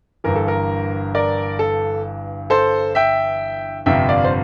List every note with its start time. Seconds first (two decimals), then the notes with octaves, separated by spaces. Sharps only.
0.24 G1 G2 E3 A#4
0.36 A4
0.48 A#4
1.14 A#4 D5
1.59 A4
2.50 A4 C5
2.95 E5 G5
3.86 G1 F2 C3 E5 G5
4.09 D5 F5
4.24 C5